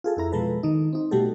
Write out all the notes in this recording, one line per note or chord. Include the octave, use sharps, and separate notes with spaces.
F4 G#4 A4
F2 E4 A#5
B2 F3 G#3 A4 B4
D#3 D#4
C4 D#4
B2 G3 A3 F#4 G4 A4